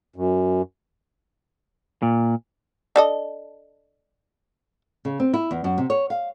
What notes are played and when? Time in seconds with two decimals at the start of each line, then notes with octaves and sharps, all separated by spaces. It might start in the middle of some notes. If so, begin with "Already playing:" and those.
0.16 F#2
2.02 A#2
2.96 D4 A4 D#5
5.05 C#3
5.20 C4
5.34 E4
5.51 E2
5.64 F#2
5.78 C3
5.90 C#5
6.10 F5